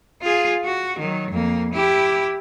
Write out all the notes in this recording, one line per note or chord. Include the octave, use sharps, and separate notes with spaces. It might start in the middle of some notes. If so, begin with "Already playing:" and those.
F4 G#4
F#4
D#3 F#3
F2 A#3
E4 G4